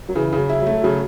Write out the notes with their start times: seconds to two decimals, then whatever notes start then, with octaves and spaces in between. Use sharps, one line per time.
0.09 F#3
0.15 C#3 E3
0.33 C#3
0.38 F#3
0.49 E4
0.61 F#3
0.67 A3
0.84 C#3 F#3